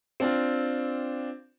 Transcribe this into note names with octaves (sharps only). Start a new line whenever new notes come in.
C4 D4 F4